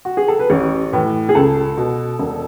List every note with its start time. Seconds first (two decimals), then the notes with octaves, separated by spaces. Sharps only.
0.05 F#4
0.17 G#4
0.28 A4
0.39 B4
0.50 A1 C#5
0.92 A2 E3 B4
1.29 G#4
1.35 C#2 A4
1.77 B2
2.19 E1